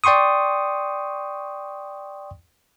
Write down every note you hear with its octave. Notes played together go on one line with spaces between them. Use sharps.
D5 G5 C6 C#6 D#6